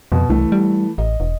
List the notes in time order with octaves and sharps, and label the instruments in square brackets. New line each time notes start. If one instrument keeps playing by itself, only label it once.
[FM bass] F2 [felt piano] B2
[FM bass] C2 [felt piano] E3 A3
[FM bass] G3
[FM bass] A1 [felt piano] D#5
[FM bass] E1